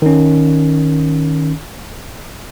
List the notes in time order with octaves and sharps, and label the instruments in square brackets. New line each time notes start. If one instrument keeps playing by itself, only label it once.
[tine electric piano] D#3 C#4